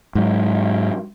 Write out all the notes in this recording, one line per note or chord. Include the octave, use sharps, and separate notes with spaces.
G#2 F#3